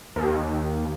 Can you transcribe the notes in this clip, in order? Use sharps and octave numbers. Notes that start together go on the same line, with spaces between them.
D#2